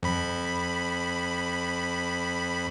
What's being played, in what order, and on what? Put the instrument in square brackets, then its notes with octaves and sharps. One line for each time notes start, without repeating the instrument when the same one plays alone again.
[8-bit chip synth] F2 B5